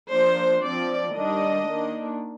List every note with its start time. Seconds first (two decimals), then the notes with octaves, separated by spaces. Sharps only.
0.11 F3 A#3 D4 C5
0.62 F3 C4 D5
1.14 D#3 G3 D4 D#5
1.66 D#3 A#3 D4